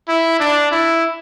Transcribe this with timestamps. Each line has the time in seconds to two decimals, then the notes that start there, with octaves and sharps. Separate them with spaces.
0.08 E4
0.40 D4
0.71 E4